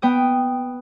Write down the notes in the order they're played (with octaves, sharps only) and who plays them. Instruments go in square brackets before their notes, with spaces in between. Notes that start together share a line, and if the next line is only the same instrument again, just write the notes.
[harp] B3 G5 D#6